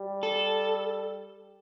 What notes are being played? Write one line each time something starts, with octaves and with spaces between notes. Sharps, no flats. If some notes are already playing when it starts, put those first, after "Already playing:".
Already playing: G3
A4